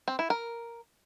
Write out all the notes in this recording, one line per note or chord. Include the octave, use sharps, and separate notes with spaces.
C4
E4
A#4